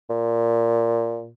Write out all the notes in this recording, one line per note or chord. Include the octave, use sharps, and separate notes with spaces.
A#2